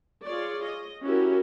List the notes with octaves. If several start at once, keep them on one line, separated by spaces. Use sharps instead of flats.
F4 G#4 C#5 D5
D#5
C#4 E4 F#4 G4 A#4